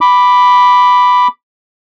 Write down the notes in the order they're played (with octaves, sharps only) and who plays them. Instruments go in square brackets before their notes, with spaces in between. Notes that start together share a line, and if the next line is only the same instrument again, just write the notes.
[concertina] B5 D6